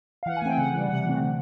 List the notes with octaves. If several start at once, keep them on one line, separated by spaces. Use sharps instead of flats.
F5
E3 F#5
G#5
A3 C4 G5
C#3 F#5
E3 G3
C3 F#5
E3 A3 C4
D3